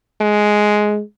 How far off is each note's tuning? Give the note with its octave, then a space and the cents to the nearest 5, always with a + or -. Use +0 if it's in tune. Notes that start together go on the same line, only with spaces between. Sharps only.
G#3 +10